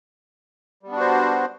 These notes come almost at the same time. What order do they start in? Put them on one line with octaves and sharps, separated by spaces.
G3 B3 D4 F#4 C5